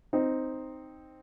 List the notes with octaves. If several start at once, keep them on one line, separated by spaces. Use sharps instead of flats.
C4 D#4